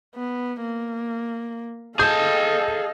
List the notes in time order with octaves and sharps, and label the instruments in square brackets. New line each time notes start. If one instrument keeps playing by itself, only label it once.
[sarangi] B3
A#3
[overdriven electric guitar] G#4 A5 [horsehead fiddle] A4 D#5 [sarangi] F5 [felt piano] G6